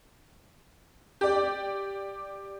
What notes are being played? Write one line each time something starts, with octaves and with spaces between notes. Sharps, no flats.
G4 D5